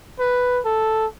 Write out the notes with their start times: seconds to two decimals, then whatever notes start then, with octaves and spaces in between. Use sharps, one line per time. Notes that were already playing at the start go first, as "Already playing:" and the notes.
0.20 B4
0.65 A4